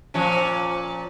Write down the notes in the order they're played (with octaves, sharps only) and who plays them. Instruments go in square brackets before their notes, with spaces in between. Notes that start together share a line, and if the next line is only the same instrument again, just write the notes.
[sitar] A#2 F3 C#4